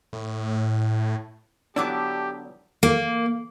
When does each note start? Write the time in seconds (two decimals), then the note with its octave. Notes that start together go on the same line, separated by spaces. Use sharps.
0.13 A2
1.76 D3 F#3 B3 D4 E4 G4 A5 D6
2.83 A#3